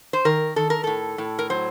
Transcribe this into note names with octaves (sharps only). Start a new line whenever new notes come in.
C5
D#3 A#4
D#3 A4
A#4
A2 A4
A2
A#4
F#3 C5